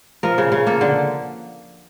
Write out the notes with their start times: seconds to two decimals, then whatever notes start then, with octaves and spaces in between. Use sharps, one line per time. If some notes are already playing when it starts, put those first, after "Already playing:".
0.23 F3 A#4
0.38 C#3
0.52 C#3
0.66 A#3 A4
0.81 D3